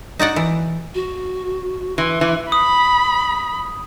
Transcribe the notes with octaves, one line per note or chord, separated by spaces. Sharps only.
D#4 F#4 D5 F#5
E3
F#4
E3 C6
E3
B5 D#6